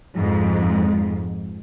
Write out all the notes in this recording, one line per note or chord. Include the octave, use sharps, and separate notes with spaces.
F2 G#2